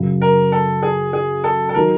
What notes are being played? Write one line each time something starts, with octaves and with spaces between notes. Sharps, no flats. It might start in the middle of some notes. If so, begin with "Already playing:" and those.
Already playing: F#2 C#3 F#3
A#4
A4
G#4
G#4
A4
A4
D#3 F#3 A#4